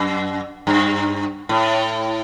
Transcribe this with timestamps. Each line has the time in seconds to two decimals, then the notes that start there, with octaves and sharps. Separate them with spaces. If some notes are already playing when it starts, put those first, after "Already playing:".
Already playing: F#2
0.67 G2
1.49 A2